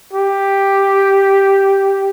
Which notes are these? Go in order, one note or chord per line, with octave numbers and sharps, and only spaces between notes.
G4